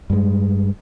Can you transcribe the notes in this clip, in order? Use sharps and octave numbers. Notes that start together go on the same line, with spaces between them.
G2 G#3